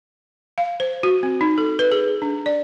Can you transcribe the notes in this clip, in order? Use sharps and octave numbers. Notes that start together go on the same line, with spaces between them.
F5
C5
F#4
C4
D#4
A4
B4
G#4
D4
D5